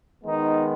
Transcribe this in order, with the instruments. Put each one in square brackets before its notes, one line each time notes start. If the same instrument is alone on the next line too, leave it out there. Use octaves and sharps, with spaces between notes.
[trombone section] D#3 G#3 B3 D#4